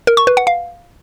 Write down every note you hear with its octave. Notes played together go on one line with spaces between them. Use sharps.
A#4
C#6
B4
F#5
F5